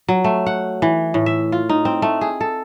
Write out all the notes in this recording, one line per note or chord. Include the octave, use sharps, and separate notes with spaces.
F#3
A3
F#5
E3
A2
E5
F4
D#4
C4
A3
G#4
A4